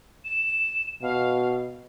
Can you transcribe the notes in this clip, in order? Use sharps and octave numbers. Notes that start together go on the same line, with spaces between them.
E7
B2 F5